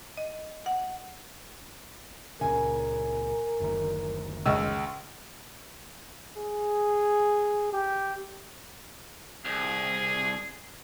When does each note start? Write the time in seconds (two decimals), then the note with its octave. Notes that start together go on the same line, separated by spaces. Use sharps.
0.17 D#5
0.66 F#5
2.41 C#2 A#2 C#3 A#4 G#5
3.60 F#1 D2 D#3
4.46 C#2 D#5 E6
6.37 G#4
7.73 G4
9.45 C2 G#4